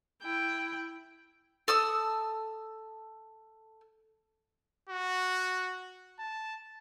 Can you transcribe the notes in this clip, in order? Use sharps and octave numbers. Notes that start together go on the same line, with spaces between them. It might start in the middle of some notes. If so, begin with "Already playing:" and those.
E4 G5
A4 D#6 E6
F#4
A5